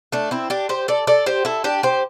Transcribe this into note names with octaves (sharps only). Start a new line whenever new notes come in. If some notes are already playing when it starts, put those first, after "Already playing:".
A3 D4
C4 E4
D4 G4
G4 C5
A4 D5
A4 D5
G4 C5
E4 A4
D4 G4
G4 C5